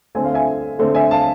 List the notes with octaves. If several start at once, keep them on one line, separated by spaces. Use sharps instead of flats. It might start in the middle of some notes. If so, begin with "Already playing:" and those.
D3 A3 C4 G#5
F5
E5 G#5
D3 A3 C4
E5 G#5
F5 A5